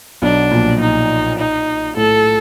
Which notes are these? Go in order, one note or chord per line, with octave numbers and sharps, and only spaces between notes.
B1 B2 D4
A#1 A#2
D#4
D#4
A2 A4